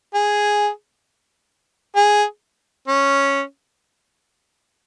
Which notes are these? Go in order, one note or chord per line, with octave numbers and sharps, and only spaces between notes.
G#4
G#4
C#4